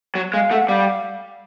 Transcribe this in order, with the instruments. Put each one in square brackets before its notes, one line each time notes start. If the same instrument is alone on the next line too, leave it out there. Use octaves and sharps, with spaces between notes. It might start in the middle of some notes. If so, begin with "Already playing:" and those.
[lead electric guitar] F#3
[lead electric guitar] G#3 [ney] F5
[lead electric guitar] A3 [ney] F#5
[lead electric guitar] G3 [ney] F5